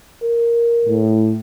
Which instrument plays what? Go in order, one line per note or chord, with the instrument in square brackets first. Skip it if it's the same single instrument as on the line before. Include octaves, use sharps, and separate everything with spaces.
[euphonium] A#4
[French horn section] A2